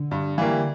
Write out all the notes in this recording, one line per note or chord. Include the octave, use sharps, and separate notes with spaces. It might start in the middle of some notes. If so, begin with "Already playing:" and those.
Already playing: D3
G2
E3 G3 A#3